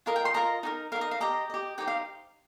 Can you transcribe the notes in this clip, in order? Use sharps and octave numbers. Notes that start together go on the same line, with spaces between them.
F4 A#4 D#5 F5
G5
C6
F4 A#4 D#5 A#5
D#4 G4 A#4
D#4 G4 A#4 F5
D#5
F5
G4 D#5 A#5
G4 D#5
D#4 G4 C5 G5
F5